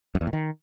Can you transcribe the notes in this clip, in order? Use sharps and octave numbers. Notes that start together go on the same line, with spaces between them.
F#2
E2
A2
D#3